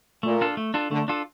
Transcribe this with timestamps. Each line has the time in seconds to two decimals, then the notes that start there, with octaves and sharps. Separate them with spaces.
0.23 A#2 A3
0.41 D4 F4 A4
0.57 A3
0.74 D4 F4 A4
0.91 D3 A3
1.08 D4 F4 A4